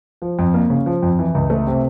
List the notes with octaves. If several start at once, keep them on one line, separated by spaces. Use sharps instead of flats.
F3
F2
A#3
C#3
F3
F2
E3
C#2
A3
C3